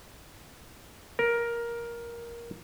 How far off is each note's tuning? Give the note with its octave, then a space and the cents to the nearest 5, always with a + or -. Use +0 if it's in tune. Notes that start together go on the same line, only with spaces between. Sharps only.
A#4 +10